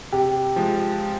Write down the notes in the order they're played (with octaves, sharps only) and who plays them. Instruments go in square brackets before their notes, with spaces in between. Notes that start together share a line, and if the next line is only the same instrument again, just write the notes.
[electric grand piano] C3 [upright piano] G4
[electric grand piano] F3 G#3